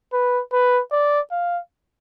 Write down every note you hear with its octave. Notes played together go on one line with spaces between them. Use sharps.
B4
B4
D5
F5